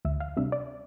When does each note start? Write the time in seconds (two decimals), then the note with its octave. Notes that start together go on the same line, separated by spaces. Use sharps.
0.05 D2 E5
0.20 F5
0.37 C3 G3 D4 E5
0.52 D5